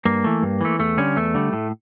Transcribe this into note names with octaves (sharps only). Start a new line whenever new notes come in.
G2 A#3
E3 A3
G2
E3 A3
E2 A3
D3 G3 C#4
E2 A3
D3 G3
A2